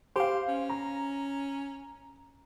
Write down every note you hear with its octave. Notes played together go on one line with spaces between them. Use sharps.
G4 C5 F5
C#4
A#5